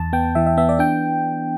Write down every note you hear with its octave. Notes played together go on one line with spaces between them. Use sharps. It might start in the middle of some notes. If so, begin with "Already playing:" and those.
Already playing: E2 A5
B3 G5
E3 E5
E5
B3 E5
D5
D4 G5